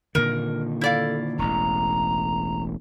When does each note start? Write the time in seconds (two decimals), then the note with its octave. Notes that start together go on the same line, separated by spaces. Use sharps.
0.15 A#2 D3 D#3 A#4
0.81 E4 A4 D5 F5
1.39 E1 A1 A#5